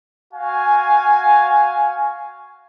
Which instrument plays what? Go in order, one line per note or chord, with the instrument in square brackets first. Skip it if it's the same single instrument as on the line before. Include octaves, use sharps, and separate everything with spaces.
[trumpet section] F#4 F5 G#5